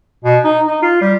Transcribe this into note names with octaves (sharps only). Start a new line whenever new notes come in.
B2
D#4
D#4
F4
G3